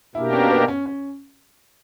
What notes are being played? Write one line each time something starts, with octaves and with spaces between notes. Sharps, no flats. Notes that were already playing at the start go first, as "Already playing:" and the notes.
B2 A#3 D4 E4 G4 A#4
C#4
B3
C#4
C#4